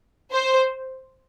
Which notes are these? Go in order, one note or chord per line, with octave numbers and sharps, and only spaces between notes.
C5